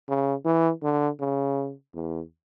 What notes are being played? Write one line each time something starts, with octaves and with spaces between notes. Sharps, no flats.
C#3
E3
D3
C#3
E2